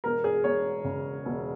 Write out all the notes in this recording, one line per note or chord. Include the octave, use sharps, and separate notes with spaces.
E1 A#4
G#4
E1 C#5
C#3
E1